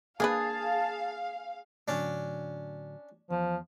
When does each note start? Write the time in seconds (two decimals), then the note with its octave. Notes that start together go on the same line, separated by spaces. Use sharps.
0.20 A#3 D4 G#4 B4 F5 A5
1.88 A2 D3 F#3 C#4 D4
3.30 E2 F3